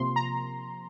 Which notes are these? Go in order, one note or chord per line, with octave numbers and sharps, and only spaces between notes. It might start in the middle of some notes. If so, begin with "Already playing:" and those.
Already playing: C3 F3 A#3 C6
A#5